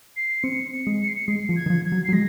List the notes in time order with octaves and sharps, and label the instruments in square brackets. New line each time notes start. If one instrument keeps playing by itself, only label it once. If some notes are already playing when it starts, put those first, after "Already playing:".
[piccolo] C7
[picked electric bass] C4 [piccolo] C#7
[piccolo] C#7
[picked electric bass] G#3
[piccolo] C#7
C7
C#7
[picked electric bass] G#3 [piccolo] C7
[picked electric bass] F3
[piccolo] G#6
[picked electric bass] D#3
F3
[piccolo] G#6
[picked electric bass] F#3
[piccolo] C7
[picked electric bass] F#3
[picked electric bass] G#3 [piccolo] A#6